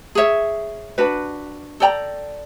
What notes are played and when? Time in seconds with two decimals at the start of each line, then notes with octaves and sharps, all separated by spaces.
0.15 G#4 C#5 E5
0.98 D4 F#4 B4
1.80 A4 D5 G5 A#5